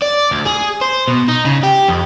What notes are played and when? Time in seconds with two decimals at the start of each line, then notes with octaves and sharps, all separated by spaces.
0.02 D5
0.32 D2
0.47 G#4
0.82 C5
1.08 B2
1.28 D#4
1.45 C#3
1.63 G4
1.88 F2